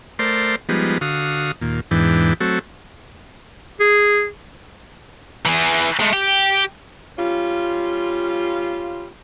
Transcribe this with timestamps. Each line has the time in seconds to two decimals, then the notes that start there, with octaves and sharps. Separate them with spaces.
0.19 A3 A#4 C5 D5 C6
0.69 F3 G3 G#3 B3 D#4
1.01 D3 F#4 F5 D#6
1.61 D#2 A#2
1.91 E2 G#2 E3 D4 G5
2.40 F#3 A3 C4 F#4 A4
3.80 G#4
5.46 E3 G#4
6.00 G#3 A3
6.13 G4
7.18 G3 C#4 F4